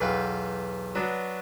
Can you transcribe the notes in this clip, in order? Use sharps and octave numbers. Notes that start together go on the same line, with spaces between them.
B1 E2 B4 F5 G5
F#3 B3 D4 F#4